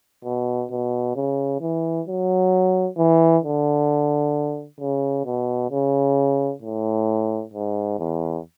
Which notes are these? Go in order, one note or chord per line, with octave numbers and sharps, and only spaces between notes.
B2
B2
C#3
E3
F#3
E3
D3
C#3
B2
C#3
A2
G#2
E2